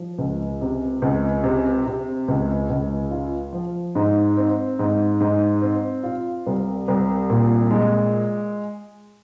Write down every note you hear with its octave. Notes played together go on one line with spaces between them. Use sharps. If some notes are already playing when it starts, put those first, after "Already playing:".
Already playing: F3
C#2
C3
C#2
C3
C3
C#2
C#2
F4
F3
G#2
C4
G#2
G#2
C4
F4
C2
C2
A#2
G#3